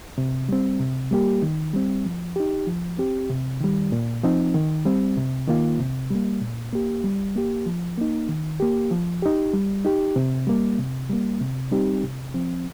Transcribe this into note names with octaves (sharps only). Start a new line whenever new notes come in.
C3
G3 C4
C3
G3 A#3 G4
D#3
G3 C4
F3
D#4 G4
F3
C4 G4
C3
D#3 G3
A#2
F3 C4 D#4
D#3
G3 C4
C3
D#3 A#3 F4
C3
G3 A#3
A#2
A#3 G4
G3
A#3 G4
F3
A#3 D#4
D#3
A#3 G4
F3
D#4 G4
G3
D#4 G4
C3
G3 A#3
C3
G3 A#3
C3
G3 C4 D#4 G4
C3
F3 C4